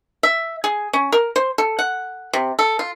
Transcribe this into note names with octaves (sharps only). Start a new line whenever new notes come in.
E5
G#4
C#4
A#4
C5
A4
F#5
C3
A4
F4